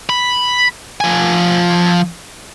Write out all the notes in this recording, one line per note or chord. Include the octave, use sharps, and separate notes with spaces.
B5
F3 G#5